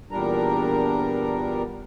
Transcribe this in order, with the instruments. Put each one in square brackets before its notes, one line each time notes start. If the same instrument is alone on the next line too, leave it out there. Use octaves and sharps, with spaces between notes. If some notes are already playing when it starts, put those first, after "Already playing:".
[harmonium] E2 A#2 G3 D4 A#4 A#5